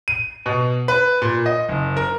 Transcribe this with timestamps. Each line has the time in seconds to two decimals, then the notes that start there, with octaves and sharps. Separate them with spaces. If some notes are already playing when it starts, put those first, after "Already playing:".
0.08 D#7
0.46 B2
0.88 B4
1.22 A#2
1.46 D#5
1.69 F#1
1.97 A#4